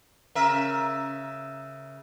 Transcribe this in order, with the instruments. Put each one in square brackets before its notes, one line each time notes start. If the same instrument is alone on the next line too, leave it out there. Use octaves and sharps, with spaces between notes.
[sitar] C#3 A#4 E5